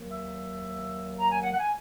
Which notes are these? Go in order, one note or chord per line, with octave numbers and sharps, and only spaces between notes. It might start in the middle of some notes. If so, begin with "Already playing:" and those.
Already playing: D#2 D#3 F#3
E5
A#5
G#5
F#5
F#5
G#5